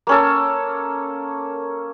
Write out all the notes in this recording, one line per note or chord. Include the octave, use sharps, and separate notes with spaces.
A#3 C#4 A4